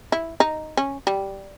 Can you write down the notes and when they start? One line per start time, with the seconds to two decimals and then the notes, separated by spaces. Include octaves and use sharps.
0.12 E4
0.40 D#4
0.77 C#4
1.07 G3